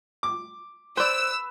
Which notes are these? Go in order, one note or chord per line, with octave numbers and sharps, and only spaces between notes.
D6
B4 C5 D5 E6